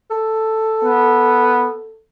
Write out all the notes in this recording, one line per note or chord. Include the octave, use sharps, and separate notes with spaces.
A4
B3